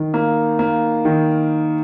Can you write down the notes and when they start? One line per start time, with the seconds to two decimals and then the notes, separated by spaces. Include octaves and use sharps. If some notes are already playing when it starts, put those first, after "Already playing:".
Already playing: D#3
0.14 A#3
0.59 A#3
1.05 D#3